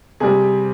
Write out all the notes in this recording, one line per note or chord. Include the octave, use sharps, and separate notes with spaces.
C3 G3 G#4